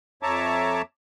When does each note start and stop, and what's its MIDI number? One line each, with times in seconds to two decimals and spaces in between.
0.23 0.82 41
0.23 0.82 73
0.23 0.82 76
0.23 0.82 81
0.23 0.82 82
0.23 0.82 86